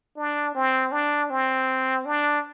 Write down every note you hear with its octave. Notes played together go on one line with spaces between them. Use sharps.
D4
C4
D4
C4
D4